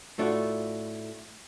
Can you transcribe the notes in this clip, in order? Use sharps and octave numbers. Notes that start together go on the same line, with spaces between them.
A2 A3 D4 F4 F#4